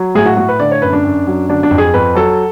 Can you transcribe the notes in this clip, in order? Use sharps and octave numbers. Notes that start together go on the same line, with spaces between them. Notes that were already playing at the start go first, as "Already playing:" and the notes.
Already playing: F#3
A2 G#4
F#4
A2 F#4
B4
D3 D5
C#5
F#2 B4
D4
F#2
F#3
D3 D4
D4
F2
G#4
F2 B4
F#3 A4